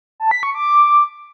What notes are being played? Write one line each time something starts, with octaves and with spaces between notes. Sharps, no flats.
A5
B6
C#6
D6